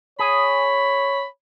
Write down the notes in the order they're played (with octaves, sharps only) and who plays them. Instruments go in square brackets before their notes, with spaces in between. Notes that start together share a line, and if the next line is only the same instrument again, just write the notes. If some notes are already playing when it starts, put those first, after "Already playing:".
[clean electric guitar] G#4 [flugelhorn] C#5 [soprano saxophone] B5